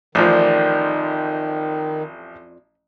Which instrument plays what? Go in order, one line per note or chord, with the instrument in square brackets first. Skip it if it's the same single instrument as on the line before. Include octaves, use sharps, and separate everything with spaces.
[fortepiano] A1 F3 [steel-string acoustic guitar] F2 D5 [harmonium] D#3